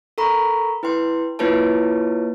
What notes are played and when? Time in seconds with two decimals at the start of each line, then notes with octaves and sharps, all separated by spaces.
0.18 A4 A#4 A#5 B5 C#6
0.83 E4 B4 G5 C6
1.39 A#3 E4 F4 B4 C#5 A5